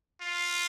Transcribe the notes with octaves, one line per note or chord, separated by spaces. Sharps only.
F4